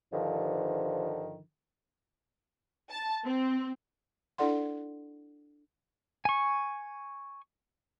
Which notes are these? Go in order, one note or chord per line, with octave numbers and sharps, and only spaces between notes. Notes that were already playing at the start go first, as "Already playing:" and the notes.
G2 D3 D#3 F3
A5
C4
D4 E4 A4 D5 F#5 C6
G#5 C#6